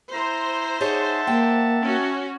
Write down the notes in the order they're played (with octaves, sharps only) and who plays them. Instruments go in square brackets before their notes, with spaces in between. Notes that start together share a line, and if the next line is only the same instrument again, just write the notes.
[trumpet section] E4 A#5 [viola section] C5
[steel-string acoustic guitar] D#4 G#4 C#5 [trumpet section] E5 F#5 A5
[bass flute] A#3 [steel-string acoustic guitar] G5
[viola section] C#4 F#4